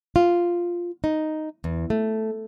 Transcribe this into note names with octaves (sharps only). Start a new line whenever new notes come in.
F4
D#4
E2
A3